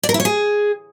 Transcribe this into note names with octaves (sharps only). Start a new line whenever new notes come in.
D5
A#4
E4
C#5
G#4